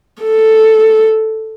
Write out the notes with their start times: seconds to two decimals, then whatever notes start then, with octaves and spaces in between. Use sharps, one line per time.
0.22 A4